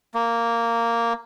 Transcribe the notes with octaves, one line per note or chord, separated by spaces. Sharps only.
A#3